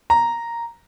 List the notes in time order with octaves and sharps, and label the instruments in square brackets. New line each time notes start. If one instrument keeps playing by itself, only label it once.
[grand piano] A#5